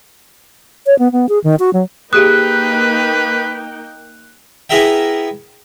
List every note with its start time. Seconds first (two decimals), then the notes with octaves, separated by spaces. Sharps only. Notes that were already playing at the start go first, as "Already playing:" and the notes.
0.87 C#5
0.99 B3
1.12 B3
1.29 G#4
1.44 D#3
1.59 F#4
1.73 F#3
2.13 A#3 D#4 G4 G#4 B4 G5 D#6 F#6
4.70 B3 E4 G#4 A#4 E5 G5